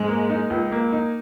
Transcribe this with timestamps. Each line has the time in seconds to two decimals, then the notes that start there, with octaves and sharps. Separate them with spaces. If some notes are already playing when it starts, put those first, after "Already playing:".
Already playing: G#2 G#3
0.08 A#3
0.30 D#4
0.50 C#2
0.72 A#3
0.93 D#4